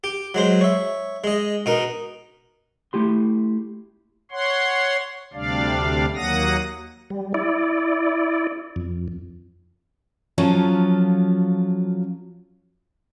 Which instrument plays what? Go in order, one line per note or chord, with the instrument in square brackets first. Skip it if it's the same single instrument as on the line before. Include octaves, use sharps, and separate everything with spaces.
[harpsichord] G4
F#3 G#3 C5
C#5 E5
G#3 D#5
B2 D#4 A#4
[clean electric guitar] A3 E4 G4 C6
[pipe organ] C#5 F#5 C6
D2 C3 G3 D4 D5 F5
D#2 F#3 A#3 F#5 D#6 A#6
[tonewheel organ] G3
E4 D5
F2
[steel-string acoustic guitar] F3 F#3 C#4 F4 A4